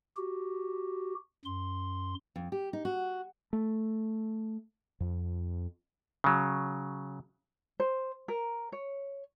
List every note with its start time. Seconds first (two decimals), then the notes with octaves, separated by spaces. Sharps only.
0.16 F#4 G4
1.45 F#2 C6
2.36 F2
2.52 G4
2.73 D#4
2.85 F#4
3.53 A3
5.00 F2
6.24 C#3 F#3
7.80 C5
8.28 A#4
8.72 C#5